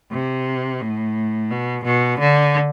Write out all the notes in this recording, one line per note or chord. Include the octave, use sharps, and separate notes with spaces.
C3
A2
B2
B2
D3